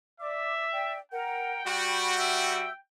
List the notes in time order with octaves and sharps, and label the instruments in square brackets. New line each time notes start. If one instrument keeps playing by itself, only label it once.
[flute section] D5 D6 [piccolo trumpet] E5
[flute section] D5 G5
[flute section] A#4 F#5 [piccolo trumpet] G5
[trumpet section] G3 F#4 [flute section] B5
[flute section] E5 E6